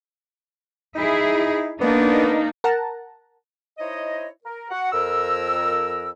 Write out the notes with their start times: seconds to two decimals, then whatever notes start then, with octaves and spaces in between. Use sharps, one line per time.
0.96 D#4 E4 G#4
1.81 A#3 B3 D4 D#4
2.64 A#4 F#5 A5 A#5
3.78 D#4 E4 C5 C#5 D#5
4.45 A#4
4.71 F#4 F#5
4.93 F2 A#4 E6